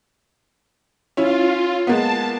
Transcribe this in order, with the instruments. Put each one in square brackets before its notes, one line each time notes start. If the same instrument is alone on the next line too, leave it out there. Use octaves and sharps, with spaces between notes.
[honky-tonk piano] C#4 E4 [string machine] F4
[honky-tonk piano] G#3 A#3 B3 [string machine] A5